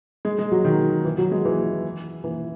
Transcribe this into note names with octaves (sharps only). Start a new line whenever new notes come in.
G#3
G#3
F#3
D#3
E3
F#3
G#3
E3
E3